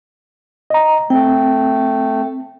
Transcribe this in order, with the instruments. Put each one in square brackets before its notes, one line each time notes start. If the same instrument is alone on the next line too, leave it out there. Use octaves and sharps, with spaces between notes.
[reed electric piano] D#5 A#5
[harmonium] A3 [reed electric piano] C4 [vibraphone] G5